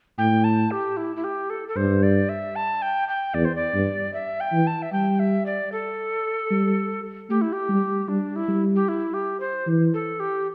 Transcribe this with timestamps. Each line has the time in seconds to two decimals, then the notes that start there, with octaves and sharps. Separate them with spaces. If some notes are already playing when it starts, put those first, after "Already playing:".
0.18 A2 G5
0.44 A5
0.71 G4
0.97 E4
1.16 E4
1.24 G4
1.50 A4
1.69 A4
1.76 G2 C5
2.03 D5
2.29 E5
2.56 A5
2.82 G5
3.08 G5
3.34 E2 D5
3.45 C5
3.55 D5
3.74 G2
4.14 E5
4.40 G5
4.53 E3
4.67 A5
4.82 E5
4.93 G3 G5
5.20 E5
5.46 D5
5.72 A4
6.51 G3
7.30 A3 G4
7.41 E4
7.53 G4
7.69 G3
8.09 G3 D4
8.36 E4
8.49 G3
8.76 G4
8.89 E4
9.14 G4
9.40 C5
9.67 E3
9.94 A4
10.20 G4